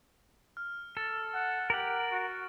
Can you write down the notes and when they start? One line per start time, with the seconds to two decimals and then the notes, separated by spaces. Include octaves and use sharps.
0.57 F6
0.97 A4 A6
1.34 F#5
1.70 G4 A#4 F#5 D7 F#7
2.11 F#4